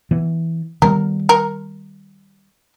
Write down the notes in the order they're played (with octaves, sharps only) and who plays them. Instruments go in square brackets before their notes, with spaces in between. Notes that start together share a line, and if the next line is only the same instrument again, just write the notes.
[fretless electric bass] E3 B3
[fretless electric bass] D#3 G3 B3 [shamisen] A#4
[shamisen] A#4